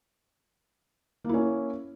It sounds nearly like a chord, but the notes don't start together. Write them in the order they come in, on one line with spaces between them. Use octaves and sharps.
A#3 E4 C#4